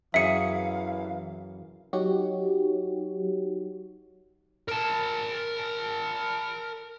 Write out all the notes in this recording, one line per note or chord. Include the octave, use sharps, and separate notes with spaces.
F#2 E3 G#4 E5 F5 C#7
F#3 D#4 F#4 G4 C#5
A#4 A5